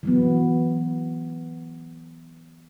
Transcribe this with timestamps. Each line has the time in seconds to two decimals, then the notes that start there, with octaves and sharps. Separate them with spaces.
0.03 E3 F#3 B3